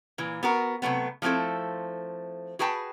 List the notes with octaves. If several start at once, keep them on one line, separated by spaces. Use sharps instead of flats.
A#2 E3
B3 F#4 A#4
C3 F#3 A3 B3
F3 A3 C4 E4 A4
F#4 G#4 B4 G5 A5